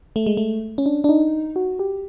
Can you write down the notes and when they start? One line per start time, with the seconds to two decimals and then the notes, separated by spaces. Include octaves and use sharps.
0.16 A3
0.26 G#3
0.37 A3
0.78 C#4
0.86 D4
1.04 D4
1.09 D#4
1.56 F#4
1.79 G4